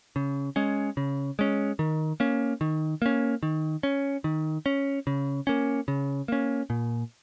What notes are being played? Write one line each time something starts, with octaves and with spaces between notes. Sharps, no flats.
C#3
G#3 C#4
C#3
G#3 C#4
D#3
A#3 C#4
D#3
A#3 C#4
D#3
C#4
D#3
C#4
C#3
A#3 C#4
C#3
A#3 C#4
A#2